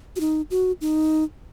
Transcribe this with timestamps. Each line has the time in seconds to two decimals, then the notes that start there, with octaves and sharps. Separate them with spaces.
0.16 F#4
0.20 D#4
0.51 F#4
0.81 D#4